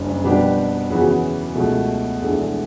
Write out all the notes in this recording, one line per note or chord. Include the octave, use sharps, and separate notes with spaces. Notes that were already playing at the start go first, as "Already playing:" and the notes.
Already playing: F#1 F#2 C#3 G3 D4
B2 G3 B3 D4 G4
E2 C#3 E3 B3 F#4
C#2 B2 A3
E1 E2 D3 A3